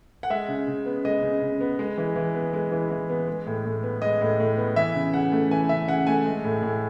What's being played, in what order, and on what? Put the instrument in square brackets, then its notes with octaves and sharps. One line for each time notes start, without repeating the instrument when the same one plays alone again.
[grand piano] F#5
G#3 E5
C#3
C#3
B3
G#3 D#5
C#3
C#3
B3
G#3
E3
E3
B3
G#3
E3
E3
B3
G#3
A2
A2
B3
G#3 D#5
A2
A2
B3
E3 E5
C#3
C#3 F#5
A3
E3 G#5
C#3 E5
C#3 F#5
A3 G#5
G#3
A2
A2